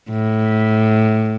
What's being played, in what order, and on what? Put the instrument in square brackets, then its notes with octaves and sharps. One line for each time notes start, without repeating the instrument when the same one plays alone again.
[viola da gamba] A2